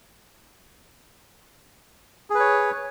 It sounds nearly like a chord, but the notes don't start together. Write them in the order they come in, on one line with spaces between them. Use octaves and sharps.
G#4 B4 C#5